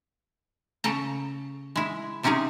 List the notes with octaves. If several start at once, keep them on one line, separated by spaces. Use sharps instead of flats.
C#3 A4 A5 A#5
G#3 E4
C3 C4 C#4 D#4 G#4 F5